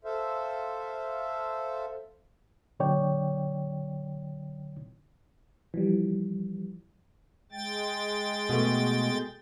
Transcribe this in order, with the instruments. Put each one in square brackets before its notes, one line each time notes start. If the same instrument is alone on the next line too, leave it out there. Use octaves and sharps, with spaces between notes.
[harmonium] A4 C5 E5 F5
[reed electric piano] A#2 D3 F#3 C#5 D5 G5
[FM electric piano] E3 F3 G3
[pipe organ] G#3 G5 A6
[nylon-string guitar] B2 A3